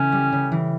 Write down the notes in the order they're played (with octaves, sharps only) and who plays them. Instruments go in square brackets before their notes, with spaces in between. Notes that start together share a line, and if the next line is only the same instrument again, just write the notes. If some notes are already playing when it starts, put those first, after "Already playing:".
Already playing: [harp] C#3 E3 A#3 A4 [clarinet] C#4
[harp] G3
C#3
E3